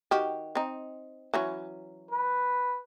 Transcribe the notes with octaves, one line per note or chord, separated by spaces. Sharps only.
D#3 F#4 G4
C4 D#4
E3 F#3 C#4
B4